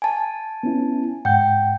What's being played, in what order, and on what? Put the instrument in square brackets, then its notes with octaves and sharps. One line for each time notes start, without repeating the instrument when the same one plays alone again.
[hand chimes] G#5 A5
[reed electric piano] B3 C#4 E4
[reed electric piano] G#2 F#5 G6 [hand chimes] G5